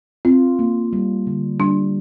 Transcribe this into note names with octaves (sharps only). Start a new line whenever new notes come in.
C4 F4
A#3
G3
D3
G3 D4